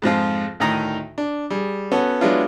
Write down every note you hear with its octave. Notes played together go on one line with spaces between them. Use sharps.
F2 G#2 F3 F4
D2 A2 D#3 D#4 A#5 D#6
D4
G3 G#4
B3 C#4 F#4 A4
F#3 G#3 B3 D4 E4 F4